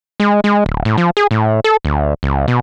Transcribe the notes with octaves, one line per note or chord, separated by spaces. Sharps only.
G#3
G#3
D1
A2
F3
G#4
A2
A4
D2
C#2
B2